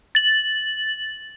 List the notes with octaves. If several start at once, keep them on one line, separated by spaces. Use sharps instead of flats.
A6 F#7